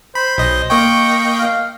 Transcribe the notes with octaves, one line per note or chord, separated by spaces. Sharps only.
C5 B5
B1 D#5
A#3 D#5 G5 C#6
F5